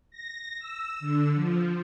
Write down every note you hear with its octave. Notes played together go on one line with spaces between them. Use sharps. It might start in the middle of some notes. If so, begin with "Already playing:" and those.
A#6
E6
D3
F3